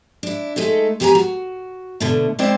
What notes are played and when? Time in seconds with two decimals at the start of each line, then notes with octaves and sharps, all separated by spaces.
0.23 D4 E4
0.56 G#3 A3 D#4 A4
1.00 E2 G4 G#4 B4 G#5 A#5
1.15 F#4
2.00 B2 D3 A3
2.39 G#3 A#3 C4 E4 C5 D5